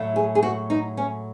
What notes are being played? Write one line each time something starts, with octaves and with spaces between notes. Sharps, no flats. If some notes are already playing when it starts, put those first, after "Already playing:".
Already playing: A2 F#3 A3
G#4
G#4
F#4
D#4
C#4